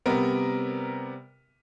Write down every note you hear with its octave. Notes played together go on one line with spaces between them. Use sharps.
C3 G3 B3 A#4